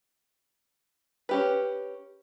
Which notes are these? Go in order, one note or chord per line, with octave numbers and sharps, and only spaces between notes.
C#4 G4 B4